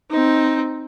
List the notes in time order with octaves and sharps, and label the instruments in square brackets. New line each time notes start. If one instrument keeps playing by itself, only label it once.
[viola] C4 D#4